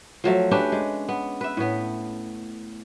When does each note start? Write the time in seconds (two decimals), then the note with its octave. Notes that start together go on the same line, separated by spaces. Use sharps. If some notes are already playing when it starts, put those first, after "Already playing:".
0.24 F3 F#3 A3
0.51 C#4 D4 G4 B4
0.72 G#3
1.09 B3
1.41 B4 E5
1.57 A2 B3